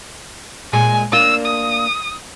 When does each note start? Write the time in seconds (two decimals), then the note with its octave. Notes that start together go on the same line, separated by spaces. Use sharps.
0.73 A#2 G#3 G#4 G#5
1.12 A#3 D4 F4 E6
1.45 D#6